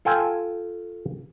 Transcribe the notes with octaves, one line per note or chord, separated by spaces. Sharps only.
F4 A4 G5 G#5